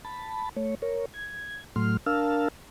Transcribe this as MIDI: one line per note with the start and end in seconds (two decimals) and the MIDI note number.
0.05 0.49 81
0.05 0.49 83
0.56 0.75 57
0.56 0.75 73
0.82 1.05 70
0.82 1.05 73
1.14 1.64 92
1.76 1.97 45
1.76 1.97 54
1.76 1.97 57
1.76 1.97 84
1.76 1.97 89
2.06 2.48 62
2.06 2.48 70
2.06 2.48 77
2.06 2.48 81
2.06 2.48 88
2.06 2.48 89